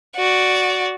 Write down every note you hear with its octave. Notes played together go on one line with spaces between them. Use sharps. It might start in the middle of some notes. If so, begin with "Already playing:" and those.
F#4 D5